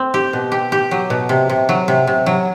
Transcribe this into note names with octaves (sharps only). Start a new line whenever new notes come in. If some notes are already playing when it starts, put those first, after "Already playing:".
Already playing: C4
G4
B2
G4
G4
F#3
B2
C3
C3
F#3
C3
C3
F#3